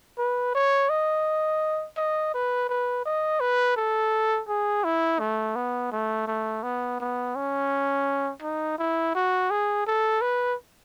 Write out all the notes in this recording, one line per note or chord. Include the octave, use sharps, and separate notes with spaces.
B4
C#5
D#5
D#5
B4
B4
D#5
B4
A4
G#4
E4
A3
B3
A3
A3
B3
B3
C#4
D#4
E4
F#4
G#4
A4
B4